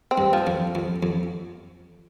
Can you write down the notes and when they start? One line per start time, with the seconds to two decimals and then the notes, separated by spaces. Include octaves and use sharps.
0.11 C4
0.18 G2
0.33 F3
0.47 F2
0.75 F2
1.03 F2